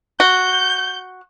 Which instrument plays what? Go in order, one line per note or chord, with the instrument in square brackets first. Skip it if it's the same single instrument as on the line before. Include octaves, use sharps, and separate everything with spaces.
[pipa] F#4 [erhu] G6